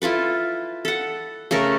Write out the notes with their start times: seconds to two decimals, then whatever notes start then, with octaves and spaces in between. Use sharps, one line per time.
0.02 E4 F4 A4 B4
0.85 A4 F#5
1.51 C#3 A3 A4 A#4